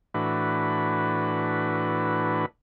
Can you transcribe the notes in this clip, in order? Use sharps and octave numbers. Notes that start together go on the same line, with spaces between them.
A2 E3 D4 F#4 B4